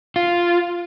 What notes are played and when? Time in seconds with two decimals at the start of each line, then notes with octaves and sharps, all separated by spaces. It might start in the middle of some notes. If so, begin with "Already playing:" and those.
0.16 F4